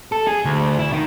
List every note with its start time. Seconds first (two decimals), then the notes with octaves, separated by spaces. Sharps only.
0.12 A4
0.27 G#4
0.45 D2
0.79 E4
0.92 D#3